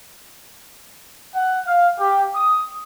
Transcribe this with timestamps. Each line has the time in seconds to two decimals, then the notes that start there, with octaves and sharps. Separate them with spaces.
1.35 F#5
1.65 F5
1.99 G4
2.35 D#6